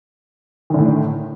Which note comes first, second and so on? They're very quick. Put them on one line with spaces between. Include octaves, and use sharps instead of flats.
D#3 D3 A2